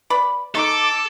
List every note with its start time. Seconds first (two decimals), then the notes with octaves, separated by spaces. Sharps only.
0.10 B4 D5 B5
0.55 D#4 A4 D6